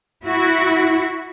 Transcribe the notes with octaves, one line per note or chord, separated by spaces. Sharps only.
E4 F#4